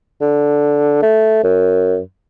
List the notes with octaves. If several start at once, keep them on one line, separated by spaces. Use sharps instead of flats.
D3
A3
F#2